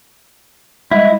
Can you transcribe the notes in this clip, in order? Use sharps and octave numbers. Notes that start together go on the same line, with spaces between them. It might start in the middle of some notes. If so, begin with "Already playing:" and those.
G3 G#3 E4 D#5